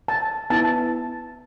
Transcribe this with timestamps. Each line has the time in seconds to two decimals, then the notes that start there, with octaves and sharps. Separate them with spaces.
0.08 A5
0.50 B3 E4 A5